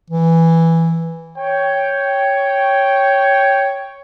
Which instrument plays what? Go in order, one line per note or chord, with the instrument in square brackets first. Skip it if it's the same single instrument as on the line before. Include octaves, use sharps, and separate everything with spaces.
[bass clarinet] E3
[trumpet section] C#5 G5